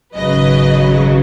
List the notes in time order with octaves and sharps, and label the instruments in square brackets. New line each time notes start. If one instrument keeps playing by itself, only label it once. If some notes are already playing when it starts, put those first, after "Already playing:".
[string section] G#1 F#2 C#3 F#3 B4 D#5